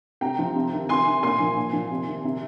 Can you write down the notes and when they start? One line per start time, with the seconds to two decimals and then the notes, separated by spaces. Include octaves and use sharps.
0.21 C3 G5 A#5
0.39 F3
0.55 C3
0.73 D#3
0.89 C3 G#5 C6
1.07 D#3
1.23 A#2 G#5 C6
1.40 F3
1.57 A#2
1.73 F3
1.91 C3
2.07 D#3
2.24 C3